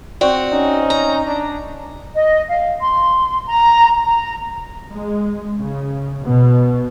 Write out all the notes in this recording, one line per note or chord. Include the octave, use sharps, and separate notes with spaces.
C4 F#4 D5
C#4 D#4
A#5
D4
D#5
F5
C6
A#5
A#5
G#3
C#3
B2